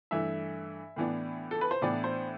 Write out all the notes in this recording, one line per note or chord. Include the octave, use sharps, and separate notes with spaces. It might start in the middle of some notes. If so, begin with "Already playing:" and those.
G2 E3 A3 E5
A2 E3 B3 D4
A4
B4
C5
A2 E3 B3 D4 D5
C5